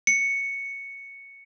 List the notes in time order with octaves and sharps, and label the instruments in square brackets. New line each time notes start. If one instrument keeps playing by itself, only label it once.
[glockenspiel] C#7